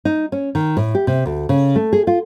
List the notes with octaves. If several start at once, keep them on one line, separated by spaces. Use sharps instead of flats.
D#4
C#4
D#3
A2
G4
C3
D2
C#3
A3
G#4
F4